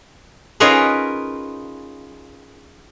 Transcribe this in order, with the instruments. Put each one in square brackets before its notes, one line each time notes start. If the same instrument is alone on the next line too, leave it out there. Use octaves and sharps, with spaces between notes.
[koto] C#4 D#4 F4 G#4 A#4 B4